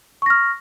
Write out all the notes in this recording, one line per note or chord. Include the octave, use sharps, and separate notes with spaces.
C#6 F6 A#6